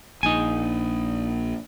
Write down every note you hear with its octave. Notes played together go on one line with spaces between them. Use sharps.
A#1 D#4 G#5